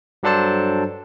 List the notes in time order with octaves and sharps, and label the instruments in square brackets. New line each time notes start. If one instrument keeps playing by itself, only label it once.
[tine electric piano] G2 F#3 D4 A4 C5 A5